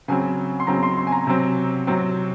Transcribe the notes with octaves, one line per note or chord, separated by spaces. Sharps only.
C#3 F#3 C4 G#5
C6
C#3 F#3 C4 A#5
C6
C6
G#5
A#5
C3 F#3 C4
C3 F#3 C4